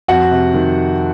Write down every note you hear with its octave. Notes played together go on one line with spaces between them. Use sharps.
F2 F#4 F#5
C3
D#3